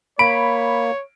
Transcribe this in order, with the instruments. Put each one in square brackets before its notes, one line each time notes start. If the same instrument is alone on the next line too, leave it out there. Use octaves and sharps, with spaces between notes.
[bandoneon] A#3 [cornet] C#5 [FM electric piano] B5 [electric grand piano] D7